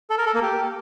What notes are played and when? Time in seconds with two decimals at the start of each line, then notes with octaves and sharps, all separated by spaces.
0.10 A4
0.18 A#4
0.26 A4
0.34 A#3
0.42 G4